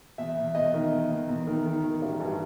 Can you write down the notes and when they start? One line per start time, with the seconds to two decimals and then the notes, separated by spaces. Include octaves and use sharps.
0.18 E2 E5
0.37 E2
0.55 E2 D#5
0.74 D#3
0.91 E2
1.11 E2
1.29 E2
1.47 D#3
1.65 D#3
1.84 D#3
2.02 A1
2.20 G2